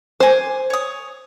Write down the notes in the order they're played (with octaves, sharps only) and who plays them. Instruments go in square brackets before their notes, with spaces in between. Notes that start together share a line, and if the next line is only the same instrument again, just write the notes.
[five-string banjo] C5 [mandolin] G#5 D6
[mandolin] C#5 D#6